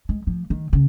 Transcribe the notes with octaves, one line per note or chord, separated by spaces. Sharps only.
G#3
F3
D#3
C#3